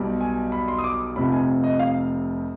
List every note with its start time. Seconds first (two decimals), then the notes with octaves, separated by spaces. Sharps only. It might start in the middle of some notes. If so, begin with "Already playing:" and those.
Already playing: B1 B2 G3
0.21 G#5
0.52 B5
0.68 C6
0.78 D#6
0.84 D6
1.16 F1 F2 C3 F3 B5
1.32 G#5
1.64 D#5
1.79 F5